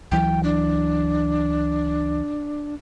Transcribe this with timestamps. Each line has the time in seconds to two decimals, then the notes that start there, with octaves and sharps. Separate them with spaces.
0.11 C#2 E3 F#3 G5
0.43 D4